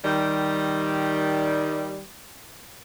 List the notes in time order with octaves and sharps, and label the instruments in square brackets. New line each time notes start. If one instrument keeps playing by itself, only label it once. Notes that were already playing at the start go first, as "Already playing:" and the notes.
[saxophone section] D#3 G3